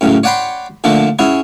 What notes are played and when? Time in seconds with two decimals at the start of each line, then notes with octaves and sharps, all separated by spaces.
0.01 F#2 A2 C#3
0.24 C#5 D5 F#5 G5 B5 C6
0.84 A#2 D3 F3 A3 D4
1.19 C#4 E4 F#4 G#4